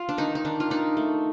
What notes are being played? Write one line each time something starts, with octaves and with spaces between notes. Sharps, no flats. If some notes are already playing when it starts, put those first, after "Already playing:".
Already playing: F4
D4
D#3 D#4
D#4
D#3 D4
F4
D4 D#4
A3